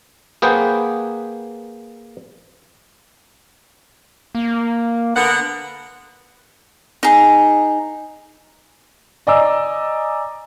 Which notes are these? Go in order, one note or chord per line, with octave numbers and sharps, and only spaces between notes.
A#3 G#4 B4 C5 F#5 G5
A#3
D3 B3 A#4 F#5
D#4 G#4
D5 D#5 G#5 A#5 D6 E6